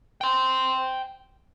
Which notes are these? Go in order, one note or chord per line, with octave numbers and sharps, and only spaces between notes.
G5 C6